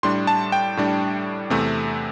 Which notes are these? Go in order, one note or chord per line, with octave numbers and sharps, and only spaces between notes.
A2 G3 D4 C6
A5
G5
A2 G3 D4
E2 C3 A3 C4